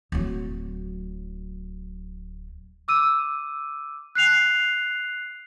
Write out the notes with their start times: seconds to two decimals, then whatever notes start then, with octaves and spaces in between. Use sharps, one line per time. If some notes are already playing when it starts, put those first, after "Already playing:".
0.12 D1 F#3
2.88 D6 E6 D#7
4.15 F#6 C7 F7